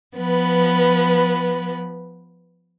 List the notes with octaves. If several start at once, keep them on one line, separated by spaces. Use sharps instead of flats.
F3 B3 B4